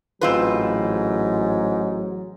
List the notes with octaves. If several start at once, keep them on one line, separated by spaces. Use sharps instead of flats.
A1 G#2 F#3 C4 F4 B4